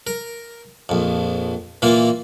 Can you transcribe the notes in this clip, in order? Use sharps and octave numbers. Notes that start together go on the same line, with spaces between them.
A#4
A#1 F2
A#2 E3 A#3 F4